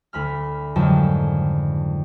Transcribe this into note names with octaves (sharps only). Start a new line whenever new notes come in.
D2 B5 F6
F2 G#2 D3 D#3 F#3 G3